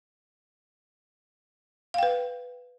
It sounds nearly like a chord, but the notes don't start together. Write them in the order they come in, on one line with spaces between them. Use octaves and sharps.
F5 G5 B4